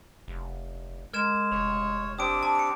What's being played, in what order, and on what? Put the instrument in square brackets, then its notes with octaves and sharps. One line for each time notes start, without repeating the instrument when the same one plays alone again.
[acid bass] F1
[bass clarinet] G#3 [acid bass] A#4 [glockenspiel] F6 G#6 E7
[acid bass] F1 [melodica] C#5 [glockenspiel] F7
[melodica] C4 D4 G4 [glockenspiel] D#6 D7
[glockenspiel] A5
D6 C#7